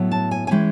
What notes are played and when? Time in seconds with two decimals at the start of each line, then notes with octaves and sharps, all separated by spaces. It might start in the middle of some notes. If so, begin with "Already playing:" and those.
Already playing: A2 F#3 B3
0.11 A5
0.31 G#5
0.47 G#5
0.51 E3 G#3 C#4 G5